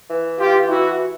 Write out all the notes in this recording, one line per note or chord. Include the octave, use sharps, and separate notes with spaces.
E3
F4 G4
E4 F#4